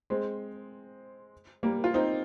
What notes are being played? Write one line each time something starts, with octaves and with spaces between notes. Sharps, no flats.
G#3 C4
G3 A#3
F4
C4 D#4